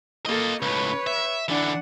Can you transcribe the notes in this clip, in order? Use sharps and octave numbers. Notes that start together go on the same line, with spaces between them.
A#3 F4 A4 D#5
C#2 A2 B4 C#5
E5
D3 E3 D4 F#5